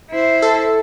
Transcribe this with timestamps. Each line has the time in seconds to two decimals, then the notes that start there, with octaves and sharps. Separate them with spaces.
0.10 E4 C5
0.42 A4